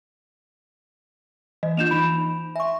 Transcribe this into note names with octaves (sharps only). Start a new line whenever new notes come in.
E3 D#5
A#3 D4 F4 G6 E7 F7
E3 D#4 B5 D7
E5 G#5 C6 C#6